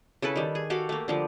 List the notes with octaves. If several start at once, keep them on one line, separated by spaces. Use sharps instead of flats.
C#3 E4 A4 B4
D#3 G3
G#4
F#4 G4 A4 F5
A3 A#3
D3 F3 G3